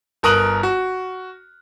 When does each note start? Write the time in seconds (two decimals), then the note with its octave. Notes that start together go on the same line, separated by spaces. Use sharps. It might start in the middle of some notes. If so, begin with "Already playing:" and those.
0.23 G1 A#4 A#5 D#6 F#6 F#7
0.63 F#4